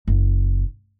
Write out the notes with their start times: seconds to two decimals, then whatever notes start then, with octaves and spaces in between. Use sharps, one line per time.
0.07 F#1